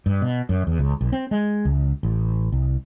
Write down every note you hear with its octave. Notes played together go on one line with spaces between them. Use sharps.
G2
B2
F#2
E2
C#2
B1
C4
G#3
C#2
A1
C2